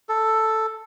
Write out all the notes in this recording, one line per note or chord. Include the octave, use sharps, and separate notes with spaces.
A4